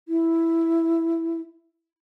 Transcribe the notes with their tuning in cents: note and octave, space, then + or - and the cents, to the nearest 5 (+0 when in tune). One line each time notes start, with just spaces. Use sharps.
E4 +0